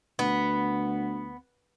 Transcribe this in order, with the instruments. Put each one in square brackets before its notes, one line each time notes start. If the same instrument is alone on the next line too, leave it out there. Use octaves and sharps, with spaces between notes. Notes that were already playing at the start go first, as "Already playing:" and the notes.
[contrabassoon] D2 [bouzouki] B3